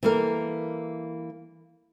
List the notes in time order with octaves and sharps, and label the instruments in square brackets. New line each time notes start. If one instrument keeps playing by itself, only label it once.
[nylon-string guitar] E3 G3 A#3 A4 A#4